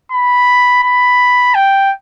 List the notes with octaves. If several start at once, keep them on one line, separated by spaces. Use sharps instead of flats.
B5
B5
G5